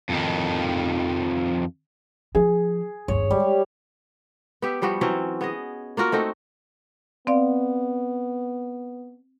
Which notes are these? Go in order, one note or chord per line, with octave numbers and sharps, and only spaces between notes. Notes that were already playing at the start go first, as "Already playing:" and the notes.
F2 D#3
F3 G#4
G1 D#2 C#5
G3 G#3
B3 G4 E5
F3 G3 B3 F#4
E3 F#3 C4 C#4
B3 G#4 D#5
A#3 F4 F#4 A#4
A3 C4 D#4 F#4
B3 C4 D5 F5